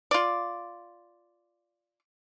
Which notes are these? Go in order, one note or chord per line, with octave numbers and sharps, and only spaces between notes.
F4 D5